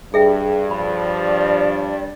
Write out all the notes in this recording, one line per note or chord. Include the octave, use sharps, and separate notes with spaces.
G2 G#4 E5 G5
F3 D5 B5